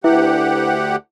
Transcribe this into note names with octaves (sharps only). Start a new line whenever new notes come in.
D2 E4 G4 B4 E5 F#5